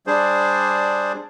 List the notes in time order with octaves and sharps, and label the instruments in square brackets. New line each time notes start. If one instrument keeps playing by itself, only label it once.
[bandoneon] G3 D4 G#4 C5